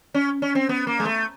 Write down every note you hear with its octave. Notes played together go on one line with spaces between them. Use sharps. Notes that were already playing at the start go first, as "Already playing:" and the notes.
C#4
C#4
C4
B3
A#3
G#3
A3